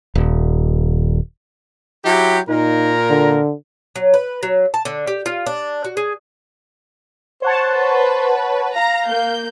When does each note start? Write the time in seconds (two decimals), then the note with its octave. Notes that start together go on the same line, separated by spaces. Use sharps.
0.15 D#1
2.05 F#3 E4 G4
2.49 A#2 D#4 A#4
3.09 D3
3.96 F#3
4.14 B4
4.43 F#3
4.74 A5
4.85 D3
5.07 G4
5.26 F4
5.46 D4
5.85 F#4
5.97 G#4
7.42 C5 C#5 F#5 A5
7.73 B4
8.76 F5 A#5 A#6
9.07 A#3 G6